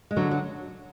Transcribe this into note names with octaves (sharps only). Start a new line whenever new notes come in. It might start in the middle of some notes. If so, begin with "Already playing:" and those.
G#3
D3 F#3
F#3